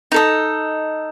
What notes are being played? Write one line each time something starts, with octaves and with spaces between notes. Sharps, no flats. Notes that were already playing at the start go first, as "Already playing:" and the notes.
D#4 A4 D#5